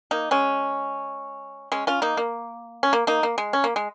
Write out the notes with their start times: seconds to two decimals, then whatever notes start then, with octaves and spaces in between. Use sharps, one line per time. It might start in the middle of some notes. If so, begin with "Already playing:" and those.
0.11 A#3 D#4
0.31 G#3 C#4
1.72 G#3 C#4
1.87 C#4 F4
2.02 A#3 D#4
2.17 A#3
2.83 C#4
2.93 A#3
3.07 A#3 D#4
3.23 A#3
3.38 G#3
3.53 C#4
3.64 A#3
3.76 G#3